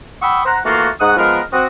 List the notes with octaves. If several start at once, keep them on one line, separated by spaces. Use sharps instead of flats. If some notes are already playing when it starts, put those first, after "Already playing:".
F#5 G5 B5 C#6 D#6 E6
C5 F#5 A#5
E3 A3 A#3 F4 F#4
G#2 F#5 D#6
F3 G#3 B3 A#4
C4 F#4 D#6